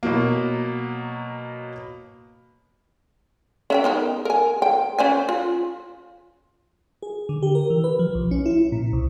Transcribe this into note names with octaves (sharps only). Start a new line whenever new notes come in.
B2 F#3 A#3
C#4 E5 G5
B3 D#4 A#4
A#4 G#5
G5
C#4 C5 G#5
F4
G#4
D3
G4
A#4
E3
B4
F3
B1
C#4
E4
A#2
C2